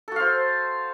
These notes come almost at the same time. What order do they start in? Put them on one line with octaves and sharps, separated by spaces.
A4 F#4 F5 C5